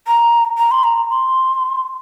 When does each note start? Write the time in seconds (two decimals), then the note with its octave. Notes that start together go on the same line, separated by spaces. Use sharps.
0.07 A#5
0.58 A#5
0.71 C6
0.84 A#5
1.10 C6